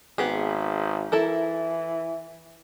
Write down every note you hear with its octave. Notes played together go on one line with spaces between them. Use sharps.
G#1 B3 G4 G#4
E3 E4 A4 A#4